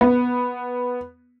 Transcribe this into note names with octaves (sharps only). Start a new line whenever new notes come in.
B3